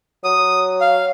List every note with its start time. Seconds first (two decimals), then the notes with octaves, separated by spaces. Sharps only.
0.24 F#3 D#6
0.81 F5